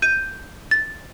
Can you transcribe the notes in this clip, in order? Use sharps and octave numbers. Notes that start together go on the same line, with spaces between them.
G6 D#7
A6